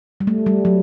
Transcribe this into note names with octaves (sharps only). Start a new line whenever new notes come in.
G3
A3
G3
F#3